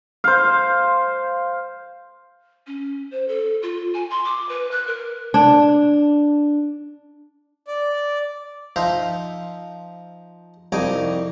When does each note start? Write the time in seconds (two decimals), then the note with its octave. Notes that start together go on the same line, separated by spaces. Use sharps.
0.24 C5 F5
2.67 C#4
3.11 C5
3.28 A4
3.62 F4
3.94 G#5
4.10 C6
4.25 D6
4.49 B4
4.71 F#6
4.87 A#4
5.34 D4
7.67 D5
8.76 F3 D#4 C5 E5 F5
10.72 C2 F2 G3 D#4 G#5 D6